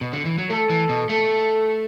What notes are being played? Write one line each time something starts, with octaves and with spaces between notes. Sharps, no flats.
B2
D3
E3
F#3
A3 A4
E3
B2
A3 A4